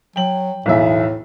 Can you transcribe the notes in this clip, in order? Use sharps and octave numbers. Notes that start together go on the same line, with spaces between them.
F#3 G5 F#7
B1 E2 A2 E5